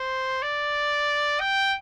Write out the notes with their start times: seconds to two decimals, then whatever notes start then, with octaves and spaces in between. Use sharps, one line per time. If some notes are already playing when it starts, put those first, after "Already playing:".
Already playing: C5
0.42 D5
1.40 G5